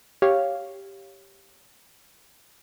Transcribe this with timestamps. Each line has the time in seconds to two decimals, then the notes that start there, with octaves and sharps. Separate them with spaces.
0.22 G4 C#5 F5